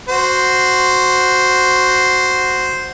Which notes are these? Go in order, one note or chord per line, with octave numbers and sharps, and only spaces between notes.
F#4 C5